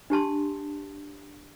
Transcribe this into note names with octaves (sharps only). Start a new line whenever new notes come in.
D4 G4 A5 C6